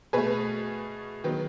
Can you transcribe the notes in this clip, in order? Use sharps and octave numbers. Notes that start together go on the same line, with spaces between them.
B2 A3 G#4 B4
D#3 F#3 B3